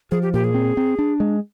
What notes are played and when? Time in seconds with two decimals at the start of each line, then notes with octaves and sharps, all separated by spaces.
0.11 F3 G#4
0.22 G4
0.33 A#2 G4
0.44 G#4
0.54 C4
0.77 C4
0.99 D4
1.20 G#3